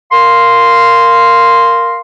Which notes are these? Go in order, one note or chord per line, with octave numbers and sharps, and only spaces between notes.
A#4 F5 C6